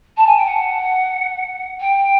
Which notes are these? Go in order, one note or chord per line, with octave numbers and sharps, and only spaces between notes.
A5
G#5
G5
F#5
G5